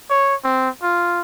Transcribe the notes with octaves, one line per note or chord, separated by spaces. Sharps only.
C#5
C4
F4